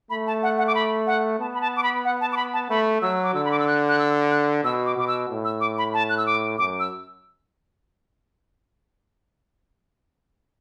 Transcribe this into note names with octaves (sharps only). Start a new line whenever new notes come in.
A3 B5
A5
F#5
F#5
D6
B5
F#5
B3 A5
B5
A5
D6
B5
F#5
A5
D6
B5
A5
A3 B5
F#3 E6
D6
D3 E6
B5
D6
E6
F#6
F#6
E6
F#6
B2 E6
D6
B2 D6
E6
A2
E6
D6
B5
A5
F#6
E6
D6
F#2 D6
E6